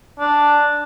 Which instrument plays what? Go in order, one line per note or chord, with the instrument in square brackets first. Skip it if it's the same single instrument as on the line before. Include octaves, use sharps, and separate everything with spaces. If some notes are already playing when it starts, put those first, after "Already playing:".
[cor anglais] D4